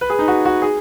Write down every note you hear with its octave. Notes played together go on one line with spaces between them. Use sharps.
B4
G#4
D#4
F#4
F#4
G#4